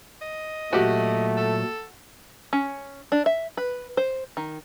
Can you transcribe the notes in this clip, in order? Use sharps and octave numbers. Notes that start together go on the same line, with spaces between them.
D#5
A#2 F#3 A3 F#4 G4
A4
C#4
D4
E5
B4
C5
D#3